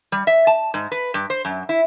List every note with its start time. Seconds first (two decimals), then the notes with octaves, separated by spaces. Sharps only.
0.12 G3
0.27 E5
0.47 A5
0.74 G#2
0.92 B4
1.14 G2
1.30 C5
1.45 F#2
1.69 E4